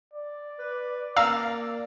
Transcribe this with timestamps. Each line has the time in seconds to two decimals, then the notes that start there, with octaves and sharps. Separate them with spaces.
0.14 D5
0.59 B4
1.17 A#3 D5 F5 A#5 E6